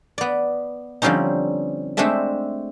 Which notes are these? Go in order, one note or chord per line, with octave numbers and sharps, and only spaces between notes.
B3 D5
D3 F3 G3 C4 C#4 D#4
G#3 A3 C4 D4 A4 E5